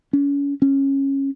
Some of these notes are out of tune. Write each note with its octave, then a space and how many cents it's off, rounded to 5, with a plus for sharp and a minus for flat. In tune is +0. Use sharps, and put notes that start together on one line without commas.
C#4 +35
C#4 -15